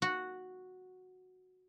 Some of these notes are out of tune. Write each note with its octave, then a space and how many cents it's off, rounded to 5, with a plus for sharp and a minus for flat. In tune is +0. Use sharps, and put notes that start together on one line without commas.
F#4 -5